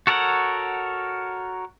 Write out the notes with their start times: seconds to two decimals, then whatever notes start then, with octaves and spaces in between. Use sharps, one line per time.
0.07 F#4 A4 A#4 C#5 F#5